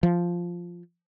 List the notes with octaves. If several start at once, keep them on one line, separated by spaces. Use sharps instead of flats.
F3